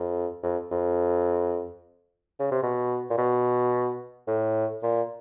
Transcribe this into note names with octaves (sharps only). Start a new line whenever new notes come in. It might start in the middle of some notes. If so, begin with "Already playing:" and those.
Already playing: F2
F2
F2
C#3
C3
B2
A#2
B2
A2
A#2